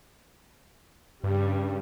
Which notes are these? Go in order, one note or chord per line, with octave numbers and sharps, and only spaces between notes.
G2 C#3 G3